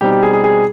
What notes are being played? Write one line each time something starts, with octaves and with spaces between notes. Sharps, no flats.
B2 G3 C4 D#4 G4
G4
G#4
G#4
G#4